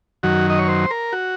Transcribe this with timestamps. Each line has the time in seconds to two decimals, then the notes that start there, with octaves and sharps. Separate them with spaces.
0.23 F#2 D#3 F#3 F#4
0.50 D#5
0.59 C#5
0.68 C5
0.91 A#4
1.13 F#4